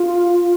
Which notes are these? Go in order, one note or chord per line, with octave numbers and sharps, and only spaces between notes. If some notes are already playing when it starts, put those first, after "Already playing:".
Already playing: F4